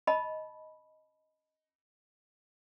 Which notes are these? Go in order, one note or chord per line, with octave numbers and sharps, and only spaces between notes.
D#5 A5 B5